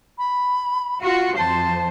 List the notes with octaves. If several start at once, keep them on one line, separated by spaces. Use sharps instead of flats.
B5
F4 F#4
F2 C5 A5